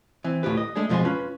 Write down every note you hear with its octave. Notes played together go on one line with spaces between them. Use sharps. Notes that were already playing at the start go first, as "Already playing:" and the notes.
E3 C4
D2 A2 F4 G4 B4
D#5
G#3 A3 D4 G#4
F2 B2 F3 G#3 G#4 C6
C#4 F4 B4